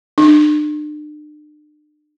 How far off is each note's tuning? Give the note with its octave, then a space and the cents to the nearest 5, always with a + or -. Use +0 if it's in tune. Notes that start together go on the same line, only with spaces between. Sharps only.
D4 +40